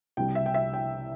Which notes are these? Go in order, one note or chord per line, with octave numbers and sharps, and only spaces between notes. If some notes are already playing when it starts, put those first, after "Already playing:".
C2 C3 G3 G5
E5
G5
E5
G5